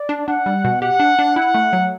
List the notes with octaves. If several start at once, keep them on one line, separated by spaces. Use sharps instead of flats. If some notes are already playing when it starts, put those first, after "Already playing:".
Already playing: D5
D4
D4 F#5
G3
B2
G4 F#5
D4
D4
E4 F#5
A3
F#3